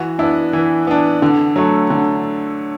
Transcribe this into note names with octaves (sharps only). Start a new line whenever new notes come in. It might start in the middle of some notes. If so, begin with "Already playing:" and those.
Already playing: E3 F#4
B3 D4 E4
E3
B3 D4
D3
F#3 A3
D3